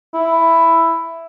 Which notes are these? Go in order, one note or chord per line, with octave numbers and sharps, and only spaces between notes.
E4